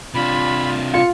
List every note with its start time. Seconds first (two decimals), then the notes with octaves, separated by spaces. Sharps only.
0.14 C3 D4 F4 B5
0.94 F4 C#7